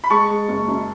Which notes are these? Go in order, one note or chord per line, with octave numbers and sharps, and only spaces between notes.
B5
G#3 A5 C#6
G#3
F#1
F#2